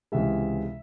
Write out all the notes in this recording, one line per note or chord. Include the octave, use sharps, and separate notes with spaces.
C#2 C3 E3 G#3 E5